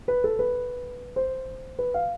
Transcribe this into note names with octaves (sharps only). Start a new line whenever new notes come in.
B4
A4
B4
C5
B4
F5